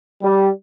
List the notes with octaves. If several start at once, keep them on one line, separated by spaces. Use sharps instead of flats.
G3